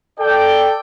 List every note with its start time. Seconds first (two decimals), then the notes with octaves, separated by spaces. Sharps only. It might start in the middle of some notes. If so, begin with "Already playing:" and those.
0.19 A4 D5 G5